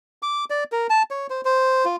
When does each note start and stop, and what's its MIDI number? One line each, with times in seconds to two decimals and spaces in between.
0.22 0.45 86
0.50 0.64 74
0.72 0.87 70
0.90 1.03 81
1.11 1.27 73
1.30 1.41 72
1.45 1.85 72
1.85 1.96 65